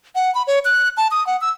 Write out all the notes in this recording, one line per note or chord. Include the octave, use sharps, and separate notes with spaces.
F#5
B5
C#5
F#6
A5
D#6
F#5
E6